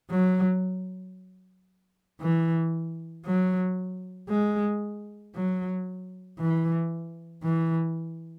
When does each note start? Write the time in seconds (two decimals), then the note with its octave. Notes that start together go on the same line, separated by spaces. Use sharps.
0.11 F#3
2.21 E3
3.26 F#3
4.29 G#3
5.35 F#3
6.39 E3
7.43 E3